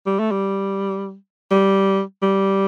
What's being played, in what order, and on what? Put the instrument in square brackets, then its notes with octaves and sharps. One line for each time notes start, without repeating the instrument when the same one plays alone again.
[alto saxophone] G3
A3
G3
G3
G3